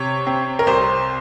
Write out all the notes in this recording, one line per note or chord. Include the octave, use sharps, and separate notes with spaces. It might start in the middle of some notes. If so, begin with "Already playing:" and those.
Already playing: C3 C#5
C4
A#4
C2 C5